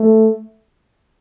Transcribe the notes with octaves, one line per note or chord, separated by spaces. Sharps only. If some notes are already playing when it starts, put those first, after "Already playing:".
Already playing: A3